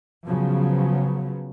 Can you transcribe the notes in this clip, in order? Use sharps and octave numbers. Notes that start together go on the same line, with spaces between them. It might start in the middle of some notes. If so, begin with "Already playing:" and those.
C#3 F3 F#3 B3